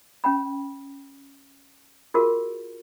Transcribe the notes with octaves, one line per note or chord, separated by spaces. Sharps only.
C#4 G5 B5
F4 F#4 G#4 A#4